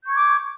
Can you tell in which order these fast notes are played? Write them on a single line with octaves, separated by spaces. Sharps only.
G6 C#6 G#6 D6